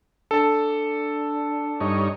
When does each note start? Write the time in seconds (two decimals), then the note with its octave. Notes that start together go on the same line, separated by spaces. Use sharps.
0.31 D4 A4 A5
1.80 G2 D#4 C#5